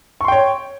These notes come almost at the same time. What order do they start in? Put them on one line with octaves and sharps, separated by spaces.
C#6 C6 G5 C#5